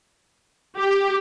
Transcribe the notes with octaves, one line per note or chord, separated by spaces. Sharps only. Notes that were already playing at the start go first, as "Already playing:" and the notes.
G4